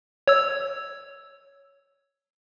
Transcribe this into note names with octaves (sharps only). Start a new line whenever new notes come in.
C#5 E6